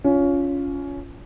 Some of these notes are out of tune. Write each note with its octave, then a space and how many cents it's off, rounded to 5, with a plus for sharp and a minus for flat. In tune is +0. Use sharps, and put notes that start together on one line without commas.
C#4 +20 F4 +0